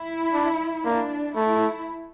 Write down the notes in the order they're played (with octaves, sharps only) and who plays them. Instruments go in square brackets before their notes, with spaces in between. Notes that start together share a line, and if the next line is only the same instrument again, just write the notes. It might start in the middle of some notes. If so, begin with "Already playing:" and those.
Already playing: [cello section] E4
[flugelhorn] D4
[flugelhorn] A#3 [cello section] D4
[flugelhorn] A3 [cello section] E4